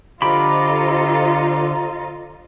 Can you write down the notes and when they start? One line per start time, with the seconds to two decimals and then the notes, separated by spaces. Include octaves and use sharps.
0.22 D3 F4 G4 A4 C5 D#5 A#5 B5